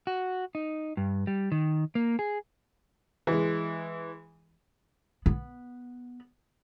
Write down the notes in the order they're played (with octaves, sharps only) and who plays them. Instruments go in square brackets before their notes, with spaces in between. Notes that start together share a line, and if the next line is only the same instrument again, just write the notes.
[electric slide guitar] F#4
D#4
G2
G3
D#3
A#3
G#4
[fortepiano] E3 G#3
[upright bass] B3